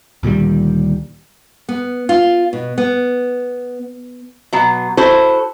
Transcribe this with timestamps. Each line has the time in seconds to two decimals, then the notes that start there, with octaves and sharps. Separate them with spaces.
0.23 D2 A#2 D#3 G3
1.69 B3
2.09 F4
2.53 B2
2.78 B3
4.53 B2 F#3
4.97 E4 F#4 A4 C5